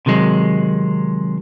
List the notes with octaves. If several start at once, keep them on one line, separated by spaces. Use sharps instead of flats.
C3 D#3 F#3 G#3